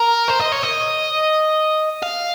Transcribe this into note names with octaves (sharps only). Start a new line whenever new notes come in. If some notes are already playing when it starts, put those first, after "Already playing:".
Already playing: A#4
C5
D#5
C#5
D#5
F5